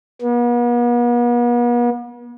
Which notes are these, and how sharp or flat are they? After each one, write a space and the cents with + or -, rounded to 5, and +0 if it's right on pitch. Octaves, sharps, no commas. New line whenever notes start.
B3 -45